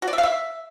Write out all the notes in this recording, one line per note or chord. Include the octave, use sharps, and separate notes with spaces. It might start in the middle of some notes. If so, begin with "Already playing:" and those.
F#4
D5
E5
F5
E5